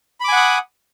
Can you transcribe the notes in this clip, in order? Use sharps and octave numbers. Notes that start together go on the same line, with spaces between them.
F#5 G#5 B5 D6 D#6